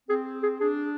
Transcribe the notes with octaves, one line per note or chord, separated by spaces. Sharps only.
C4 G#4
G#4
D4 G#4